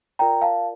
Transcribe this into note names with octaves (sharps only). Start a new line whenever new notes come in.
F4 A#4 D5 G5 A#5
F5 A5